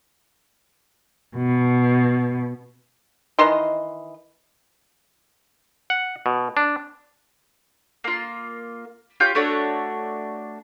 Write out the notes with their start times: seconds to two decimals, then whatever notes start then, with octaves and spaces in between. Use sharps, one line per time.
1.36 B2
3.39 D#3 E3 D#5 C6
5.90 F#5
6.26 B2
6.57 D4
8.04 A#3 F4
9.20 F4 G4 C#5 G6
9.35 A3 D4 F#4 C#5